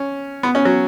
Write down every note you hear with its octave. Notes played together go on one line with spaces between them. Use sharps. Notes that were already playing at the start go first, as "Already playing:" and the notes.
Already playing: C#4
B3
C#4
F#3